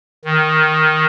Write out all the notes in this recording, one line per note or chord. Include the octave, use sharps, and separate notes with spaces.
D#3